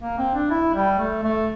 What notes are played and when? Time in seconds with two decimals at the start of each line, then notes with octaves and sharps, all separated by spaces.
0.02 A#3
0.18 C4
0.35 D4
0.51 E4
0.75 G3
0.99 A3
1.24 A3